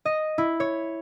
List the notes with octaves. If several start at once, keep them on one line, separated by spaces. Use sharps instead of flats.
D#5
E4
C#5